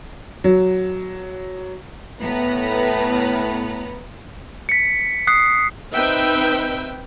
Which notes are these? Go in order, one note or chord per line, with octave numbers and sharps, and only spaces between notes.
F#3
A2 B3 B4 A#5
B6 C#7
D#6 F#6 C7
C4 D#4 B4 E5 G5